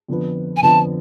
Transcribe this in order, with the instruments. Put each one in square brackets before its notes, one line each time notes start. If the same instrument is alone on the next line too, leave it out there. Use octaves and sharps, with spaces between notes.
[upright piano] F2 D3 F3 B3
[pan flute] G#5
[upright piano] F2 D3 F3 B3 [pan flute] A5